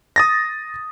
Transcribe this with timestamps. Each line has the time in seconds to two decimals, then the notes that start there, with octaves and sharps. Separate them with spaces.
0.16 D#6 A6 A#6